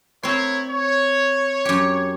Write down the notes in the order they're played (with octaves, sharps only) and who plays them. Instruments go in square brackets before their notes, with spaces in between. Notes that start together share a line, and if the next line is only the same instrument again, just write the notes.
[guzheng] C4 C5 [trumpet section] E4 A#4 C#5
[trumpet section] C#5
[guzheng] F#2 G4